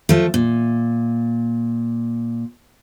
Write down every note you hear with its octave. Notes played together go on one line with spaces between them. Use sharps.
F3 A3
A#2